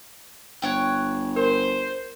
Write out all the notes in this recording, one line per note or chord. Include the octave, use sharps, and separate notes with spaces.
G1 C#5 F#5 G5
A#4 C5